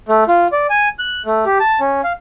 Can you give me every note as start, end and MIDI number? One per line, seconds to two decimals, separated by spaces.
0.09 0.24 57
0.28 0.47 65
0.52 0.67 74
0.70 0.89 80
0.99 1.22 90
1.26 1.45 57
1.46 1.58 67
1.60 1.80 81
1.80 2.01 61
2.04 2.13 77